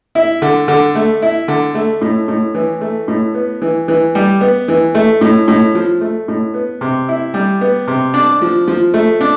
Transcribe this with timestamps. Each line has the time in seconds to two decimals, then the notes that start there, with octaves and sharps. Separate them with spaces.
0.15 E4
0.42 D3
0.68 D3
0.95 A3
1.22 E4
1.48 D3
1.75 A3
2.01 A2
2.28 A2
2.54 E3
2.81 A3
3.08 A2
3.34 B3
3.62 E3
3.88 E3
4.15 G3
4.41 B3
4.68 E3
4.95 A3
5.21 A2
5.48 A2
5.75 F3
6.01 A3
6.28 A2
6.54 B3
6.81 C3
7.08 E4
7.34 G3
7.61 B3
7.88 C3
8.14 D4
8.42 F3
8.68 F3
8.94 A3
9.21 D4